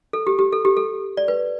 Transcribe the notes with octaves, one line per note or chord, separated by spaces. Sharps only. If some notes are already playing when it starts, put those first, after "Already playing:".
A4
G4
G4
A4
G4
A4
D5
B4